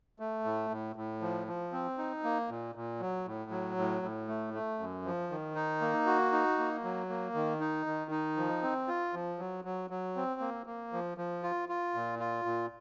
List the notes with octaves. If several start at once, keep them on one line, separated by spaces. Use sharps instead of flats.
A3
A2
A2
A2
F3
F3
C4
D#4
A#3
A#2
A#2
F#3
A2
F#3
A2
A2
A3
A3
F#2
F3
D#3
D#4
A#3
F#4
D#4
A#3
F#3
A#3
D#3
D#4
D#3
D#4
F3
C4
F4
F3
F#3
F#3
F#3
C4
A#3
A#3
F3
F3
F4
F4
A#2
F4
A#2